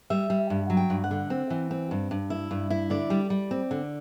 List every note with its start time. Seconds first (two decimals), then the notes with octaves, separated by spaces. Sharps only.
0.10 G3 E5
0.30 G3
0.50 G2
0.70 F#3
0.77 G5
0.90 G2
1.04 F#5
1.11 D3
1.30 C4
1.50 E3
1.71 C4
1.91 G2
2.11 G2
2.30 E4
2.51 G2
2.70 E4
2.90 D3 D5
3.10 G3
3.30 G3
3.51 C4
3.71 D3